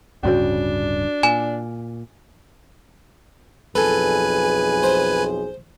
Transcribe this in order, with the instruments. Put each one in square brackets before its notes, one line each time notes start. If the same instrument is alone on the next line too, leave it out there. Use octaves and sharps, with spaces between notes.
[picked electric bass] D1 G2 C#3 [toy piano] C#4 F#4 C#5 [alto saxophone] D4
[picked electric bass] A#2 [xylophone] G#5 E7
[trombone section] B1 F2 G#4 [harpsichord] A4 [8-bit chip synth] B4 G#5
[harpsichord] C5